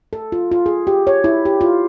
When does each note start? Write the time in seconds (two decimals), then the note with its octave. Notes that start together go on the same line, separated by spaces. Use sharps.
0.13 A4
0.32 F4
0.52 F4
0.66 G#4
0.87 G4
1.07 C#5
1.24 E4
1.45 G4
1.61 F4